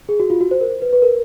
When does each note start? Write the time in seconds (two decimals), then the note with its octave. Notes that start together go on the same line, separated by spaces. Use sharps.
0.09 G#4
0.20 F#4
0.30 F4
0.41 F#4
0.51 C5
0.61 A#4
0.82 B4
0.93 B4
1.02 A#4